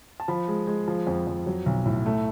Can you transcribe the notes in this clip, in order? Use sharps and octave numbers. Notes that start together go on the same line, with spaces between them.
A5
F3 B5
G#3
G#3
F3
F2
F2
F#3
B1
A2
A3